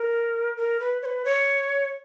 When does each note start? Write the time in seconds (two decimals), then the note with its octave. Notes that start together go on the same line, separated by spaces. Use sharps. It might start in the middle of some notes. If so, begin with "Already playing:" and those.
Already playing: A#4
0.57 A#4
0.80 B4
1.02 C#5
1.05 B4
1.25 C#5